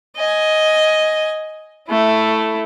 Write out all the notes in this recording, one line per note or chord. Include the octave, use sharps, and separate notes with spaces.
D#5 G#5
A3 E4